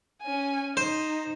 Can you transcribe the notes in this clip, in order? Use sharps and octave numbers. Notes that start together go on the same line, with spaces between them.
C#4 G#5
D#4 C5